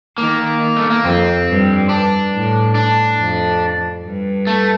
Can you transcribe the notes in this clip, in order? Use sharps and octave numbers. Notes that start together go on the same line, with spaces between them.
D#3 A#3
A3
A#3
F2 C4
G2
D4
A2
D4
F2
G2
A3